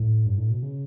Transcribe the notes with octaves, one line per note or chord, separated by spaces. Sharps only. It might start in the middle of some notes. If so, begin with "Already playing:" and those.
Already playing: A2
G2
A2
B2
C#3